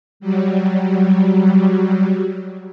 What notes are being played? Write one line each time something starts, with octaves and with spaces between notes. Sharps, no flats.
F#3 G3